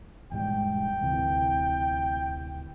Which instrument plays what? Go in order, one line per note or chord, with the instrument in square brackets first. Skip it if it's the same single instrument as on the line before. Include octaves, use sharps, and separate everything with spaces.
[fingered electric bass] E1 G#2 G3 [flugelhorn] G5
[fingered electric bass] D2 C3 E3